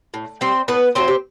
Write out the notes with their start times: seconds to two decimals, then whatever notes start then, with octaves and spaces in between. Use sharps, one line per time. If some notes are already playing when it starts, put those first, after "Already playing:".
0.14 A2
0.41 G3 C4 C5
0.68 A2 B3 B4
0.95 F#3 A3 C4 C5
1.08 G4